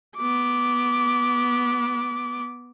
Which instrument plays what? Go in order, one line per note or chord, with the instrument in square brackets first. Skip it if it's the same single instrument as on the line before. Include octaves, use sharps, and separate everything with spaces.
[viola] B3 D6